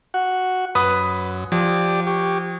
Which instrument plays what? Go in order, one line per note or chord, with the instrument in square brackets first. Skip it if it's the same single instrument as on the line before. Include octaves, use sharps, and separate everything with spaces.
[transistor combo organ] F#4 F#5
[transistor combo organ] F#2 [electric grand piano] B4 D#6
[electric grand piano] F3 [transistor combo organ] G4 D5
[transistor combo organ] G4 C#6